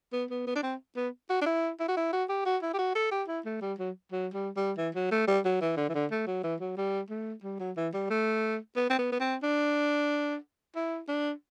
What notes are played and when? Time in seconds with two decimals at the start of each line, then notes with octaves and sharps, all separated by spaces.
0.13 B3
0.30 B3
0.47 B3
0.55 D4
0.63 C4
0.97 B3
1.30 F#4
1.41 D4
1.46 E4
1.80 E4
1.88 F#4
1.97 E4
2.12 F#4
2.29 G4
2.45 F#4
2.62 E4
2.74 G4
2.79 F#4
2.95 A4
3.11 G4
3.28 E4
3.45 A3
3.62 G3
3.79 F#3
4.12 F#3
4.34 G3
4.57 G3
4.78 E3
4.95 F#3
5.11 A3
5.27 G3
5.45 F#3
5.61 E3
5.77 D3
5.89 E3
5.94 D3
6.11 A3
6.27 F#3
6.43 E3
6.60 F#3
6.77 G3
7.10 A3
7.44 G3
7.60 F#3
7.77 E3
7.94 G3
8.10 A3
8.76 B3
8.90 C4
8.98 B3
9.12 B3
9.20 C4
9.43 D4
10.76 E4
11.08 D4